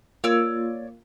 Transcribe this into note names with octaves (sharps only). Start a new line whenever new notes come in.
A#3 F4 C#5 D5 E6